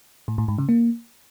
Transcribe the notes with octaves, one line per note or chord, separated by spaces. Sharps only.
A2
A2
G#2
C#3
A#3